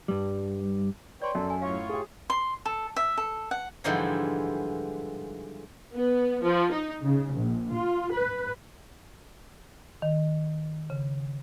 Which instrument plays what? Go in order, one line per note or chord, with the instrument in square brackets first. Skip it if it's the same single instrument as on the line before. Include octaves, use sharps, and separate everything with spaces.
[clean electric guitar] G2 G3
[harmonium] B4 C#5 G5 [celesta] D5 C6
[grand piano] F#2 [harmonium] A4
[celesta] G#5
[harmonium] A2 F4 C#5 [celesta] F5
[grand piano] G4 G#4
[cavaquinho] C6
A4
E5
A4
F#5
[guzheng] G#2 D3 E3 F3 G3 G#3
[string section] B3
F3
D#4
C#3
A#1
F4
B4
[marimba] D#3
C#3